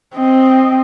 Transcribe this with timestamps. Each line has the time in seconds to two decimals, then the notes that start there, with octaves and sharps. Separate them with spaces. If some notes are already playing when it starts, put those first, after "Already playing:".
0.15 C4 D#5